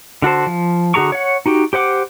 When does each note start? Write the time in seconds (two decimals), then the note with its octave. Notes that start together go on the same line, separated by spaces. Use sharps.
0.22 D3 F#4 A4 C5
0.47 F3
0.94 D3 F#4 G#4 A#5 C#6
1.12 C#5 F#5
1.46 D#4 F#4 G4
1.73 G4 C5 F#5 D6